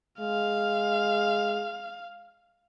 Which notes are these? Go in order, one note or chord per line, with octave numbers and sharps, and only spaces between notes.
G#3 F5